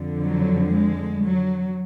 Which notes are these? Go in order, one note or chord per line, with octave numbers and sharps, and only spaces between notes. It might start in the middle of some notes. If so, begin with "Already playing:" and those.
Already playing: F2 D3
F#3
G#3
F#3